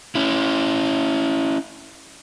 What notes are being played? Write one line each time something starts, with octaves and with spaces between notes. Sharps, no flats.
C#4 E4